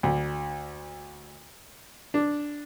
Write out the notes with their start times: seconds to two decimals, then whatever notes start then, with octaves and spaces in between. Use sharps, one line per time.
0.03 D2
2.14 D4